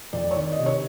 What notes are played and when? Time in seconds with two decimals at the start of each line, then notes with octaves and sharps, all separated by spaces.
0.13 F2 D5
0.31 C#5
0.36 D#3 D5
0.52 D#5
0.59 C3
0.66 C#5